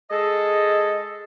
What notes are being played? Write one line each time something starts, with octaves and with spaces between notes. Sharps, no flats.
G#3 G#4 A4 D#5